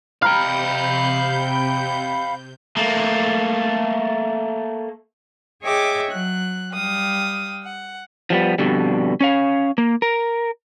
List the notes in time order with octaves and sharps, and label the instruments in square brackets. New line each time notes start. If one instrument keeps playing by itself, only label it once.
[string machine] C3 G6 [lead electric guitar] F5 G5 [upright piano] A#5 F6 [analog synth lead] B5
[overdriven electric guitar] A3 A#3
[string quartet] G#4 C#5 D#5 E5 G5 D6
F#3 F#6
G3 F5 G5 D#6
F#5
[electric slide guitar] F3 G3 B3
F2 B2 D3 G3
C#4 C#5 F5
A#3
A#4